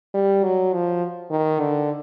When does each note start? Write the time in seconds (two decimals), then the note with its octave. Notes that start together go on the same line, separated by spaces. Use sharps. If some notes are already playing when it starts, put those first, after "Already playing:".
0.14 G3
0.44 F#3
0.73 F3
1.31 D#3
1.60 D3